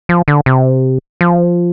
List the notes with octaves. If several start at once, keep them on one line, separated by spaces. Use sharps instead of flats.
F3
D3
C3
F3